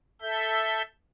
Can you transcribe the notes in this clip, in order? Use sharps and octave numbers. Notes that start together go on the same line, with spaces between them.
A4 E5 G6